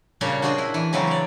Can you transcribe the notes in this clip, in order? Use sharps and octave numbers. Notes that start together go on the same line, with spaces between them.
G2 A#2 C#3 D4 C#5
D4 F#4 G#4 C5 D#5
E4
E3
C#3 E3 F#3 G#3 C4 C#4
C#5 D5